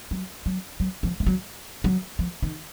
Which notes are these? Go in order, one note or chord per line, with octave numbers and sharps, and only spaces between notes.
F#3
F#3
F#3
F3
A3
F#3
F#3
F3
D#3